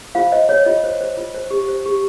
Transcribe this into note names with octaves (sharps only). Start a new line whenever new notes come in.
F4 C5 F5
C5 D#5
C5 C#5
F4 D#5
C5
C5
F4
C5
G4
C5
G4